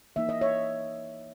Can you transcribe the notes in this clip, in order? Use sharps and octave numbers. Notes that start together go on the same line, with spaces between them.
E3 A#3 D#4 E5
D#5
C#5 E5